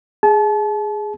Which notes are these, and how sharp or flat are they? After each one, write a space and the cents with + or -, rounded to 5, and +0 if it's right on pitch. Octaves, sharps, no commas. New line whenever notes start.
G#4 +0 A5 -35